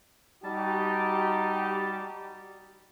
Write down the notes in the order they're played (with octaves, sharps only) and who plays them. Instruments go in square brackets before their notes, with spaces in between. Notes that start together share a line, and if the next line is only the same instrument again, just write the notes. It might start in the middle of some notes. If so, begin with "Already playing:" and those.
[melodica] G3 A5 [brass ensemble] D#4 F#4 G4